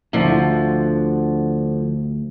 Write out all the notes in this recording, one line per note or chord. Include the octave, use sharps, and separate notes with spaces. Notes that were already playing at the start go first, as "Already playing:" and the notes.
D2 D3 F3